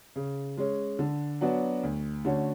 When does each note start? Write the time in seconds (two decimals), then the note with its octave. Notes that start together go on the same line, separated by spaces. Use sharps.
0.16 C#3
0.58 G#3 C#4
0.99 D3
1.41 F#3 B3 D4 F#4
1.83 D2
2.25 D3 A3 C#4 F#4